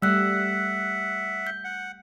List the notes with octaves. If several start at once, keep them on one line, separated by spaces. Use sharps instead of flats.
G3 A3 E5 F#5 E6 F#6
G6
F#5